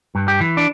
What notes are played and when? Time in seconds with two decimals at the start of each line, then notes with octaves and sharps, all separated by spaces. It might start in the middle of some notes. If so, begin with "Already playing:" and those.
0.15 G2
0.28 G4
0.40 E3
0.57 D4